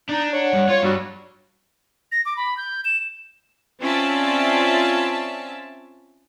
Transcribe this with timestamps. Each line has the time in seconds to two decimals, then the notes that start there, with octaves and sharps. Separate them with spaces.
0.09 D4 D#4 A#5
0.33 C#5 F#5
0.54 G2
0.69 F4 C#5
0.83 G2 F#3 G3 F#4
2.12 A#6
2.26 D6
2.37 B5
2.57 G6
2.85 E7
3.81 C4 C#4 F4 D5 E5 A5